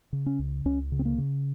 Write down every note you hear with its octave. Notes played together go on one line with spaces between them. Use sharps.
C#3
C#4
C#2
C#2 C#4
C#3
C4
A#3
C#3